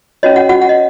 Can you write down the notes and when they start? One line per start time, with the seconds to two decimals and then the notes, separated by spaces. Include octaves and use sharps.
0.23 C#4 F#4 C#5 D#5
0.36 F#4 F#5
0.49 F#4 F#5
0.62 F#5
0.69 D#5